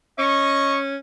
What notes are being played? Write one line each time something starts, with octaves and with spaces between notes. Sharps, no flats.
C#4 D#5 C#6